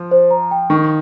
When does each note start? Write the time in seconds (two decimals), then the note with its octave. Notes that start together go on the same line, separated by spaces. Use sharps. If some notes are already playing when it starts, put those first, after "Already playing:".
Already playing: F3
0.11 C5
0.31 A#5
0.51 G5
0.70 D#3 C#6